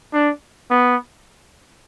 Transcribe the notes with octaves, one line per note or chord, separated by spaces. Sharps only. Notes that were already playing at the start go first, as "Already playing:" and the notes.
D4
B3